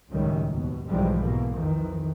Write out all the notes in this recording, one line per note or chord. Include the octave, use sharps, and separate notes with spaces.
C#2 F#2 A2 D#3 F#3 G3
D#2 B2
B1 G#2 E3 F3 G3 G#3
G#2 B2 E3 A#3
F2 D#3 E3